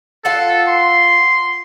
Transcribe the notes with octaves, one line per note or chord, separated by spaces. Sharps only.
F4 A4 F5 F#5
C6